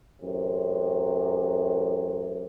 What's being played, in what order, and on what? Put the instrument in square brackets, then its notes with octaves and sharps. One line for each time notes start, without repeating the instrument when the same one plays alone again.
[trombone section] A1 F#2 C3